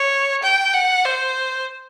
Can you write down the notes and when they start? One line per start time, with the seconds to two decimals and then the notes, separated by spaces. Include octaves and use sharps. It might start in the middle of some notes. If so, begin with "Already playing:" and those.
Already playing: C#5
0.43 G5
0.74 F#5
1.05 C5